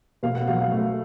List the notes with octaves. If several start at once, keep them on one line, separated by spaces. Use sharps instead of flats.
B2 F5
F#5
F#3 F5
F5
A3